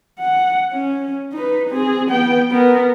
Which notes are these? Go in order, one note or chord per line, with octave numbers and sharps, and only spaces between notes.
F#5
C#4
D#4 B4
C4 G#4
B3 G5
B3 A#4